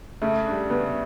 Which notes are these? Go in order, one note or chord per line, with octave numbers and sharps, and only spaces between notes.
C#3 A3
G3 D4
C#3 B3